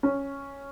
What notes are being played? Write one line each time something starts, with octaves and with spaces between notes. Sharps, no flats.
C#4